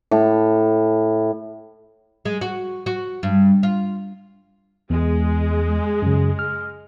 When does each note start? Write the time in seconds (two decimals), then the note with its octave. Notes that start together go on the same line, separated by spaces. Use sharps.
0.11 A2
2.25 G#3
2.41 F#4
2.86 F#4
3.23 G2
3.63 F4
4.90 E2 G#3
6.02 F#2 C#3
6.39 F6